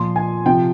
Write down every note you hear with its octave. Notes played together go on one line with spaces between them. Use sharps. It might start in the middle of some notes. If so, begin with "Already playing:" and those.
Already playing: A#2 F3 C6
G#5
C3 F3 G5